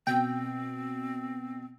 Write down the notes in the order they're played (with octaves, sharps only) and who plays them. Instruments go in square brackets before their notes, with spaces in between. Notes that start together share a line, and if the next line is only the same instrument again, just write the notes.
[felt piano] B2 [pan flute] C4 [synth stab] G5